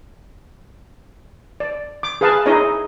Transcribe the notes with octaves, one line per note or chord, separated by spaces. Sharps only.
D5
D6
G#4 B4 F5 G#5 A5
D#4 E4 G#4 C#5 D#5